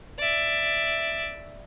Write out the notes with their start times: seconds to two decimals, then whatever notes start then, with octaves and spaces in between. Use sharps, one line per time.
0.19 D5 E5